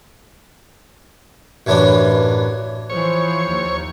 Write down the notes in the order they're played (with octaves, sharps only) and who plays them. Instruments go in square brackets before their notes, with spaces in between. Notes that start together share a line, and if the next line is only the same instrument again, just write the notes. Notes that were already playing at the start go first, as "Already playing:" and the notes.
[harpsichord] A1 F#2 E3 F#3 D4
[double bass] E3 F3 [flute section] C5 [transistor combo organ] C#5
[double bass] D#2